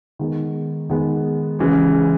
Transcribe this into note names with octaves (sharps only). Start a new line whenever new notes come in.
D#3 G#3 B3
D#3 G#3 B3
C#3 E3 G#3